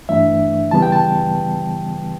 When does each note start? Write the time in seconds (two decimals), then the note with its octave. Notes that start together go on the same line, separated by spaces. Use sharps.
0.09 G2 E3 A3 D4 E5
0.71 C#3 E3 G3 B3 A5
0.82 G5
0.92 A5